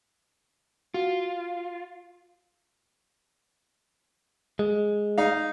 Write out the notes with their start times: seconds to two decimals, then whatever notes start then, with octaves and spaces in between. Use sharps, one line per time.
0.94 F4 F#4
4.59 G#3
5.18 D#4 F5